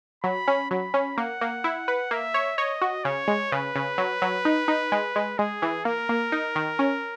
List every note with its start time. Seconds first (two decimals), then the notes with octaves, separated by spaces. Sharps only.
0.24 F#3 B5
0.48 C#4
0.70 F#3 B5
0.94 C#4
1.18 A#3 F#5
1.41 A#3
1.64 E4
1.88 B4
2.11 A#3 E5
2.34 C#5
2.57 C#5 D#5
2.81 F#4
3.04 C#3 C#5
3.28 G#3
3.52 C#3 B4
3.75 C#3
3.98 F#3
4.22 F#3
4.45 D#4
4.68 D#4
4.92 G#3
5.16 G#3
5.38 G#3 G#4
5.62 E3
5.85 A#3 A#4
6.09 A#3
6.32 D#4
6.55 D#3
6.79 C#4